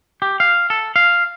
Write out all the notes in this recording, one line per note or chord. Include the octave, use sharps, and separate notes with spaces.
G4
F5
A4
F5